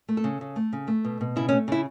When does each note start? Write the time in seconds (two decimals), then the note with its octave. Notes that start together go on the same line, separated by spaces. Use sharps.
0.09 A3
0.17 A4
0.24 C#3
0.41 C#3
0.56 A3
0.73 C#3
0.88 A3
1.05 B2
1.21 B2
1.36 C#3 E4
1.49 C#4
1.52 A3
1.68 C#3 E4